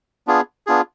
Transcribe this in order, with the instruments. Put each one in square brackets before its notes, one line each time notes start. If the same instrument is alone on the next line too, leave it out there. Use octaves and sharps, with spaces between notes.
[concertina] B3 D4 F4 G#4
B3 D4 F4 G#4